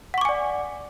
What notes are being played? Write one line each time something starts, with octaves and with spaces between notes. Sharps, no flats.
D5 F#5 G#5 C#6 D6